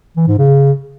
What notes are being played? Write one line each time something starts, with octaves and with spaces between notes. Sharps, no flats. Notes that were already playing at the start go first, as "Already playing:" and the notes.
E3
G#2
C#3